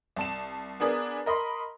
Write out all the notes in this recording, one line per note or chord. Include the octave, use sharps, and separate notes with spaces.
C2 A5 E7
B3 D4 G#4 A#4 B4
A#4 D#5 B5 C6